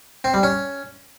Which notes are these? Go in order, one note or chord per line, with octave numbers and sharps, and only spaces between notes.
C4
G3
C#4